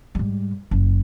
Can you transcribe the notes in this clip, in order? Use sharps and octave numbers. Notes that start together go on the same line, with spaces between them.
G#2 G3
F#1 F#3